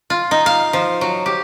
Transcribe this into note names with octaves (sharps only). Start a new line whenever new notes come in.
F4
D#4
F5
F3
F#3
G4